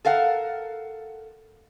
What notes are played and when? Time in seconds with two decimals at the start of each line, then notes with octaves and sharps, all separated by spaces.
0.05 A4 A#4 F5 F#5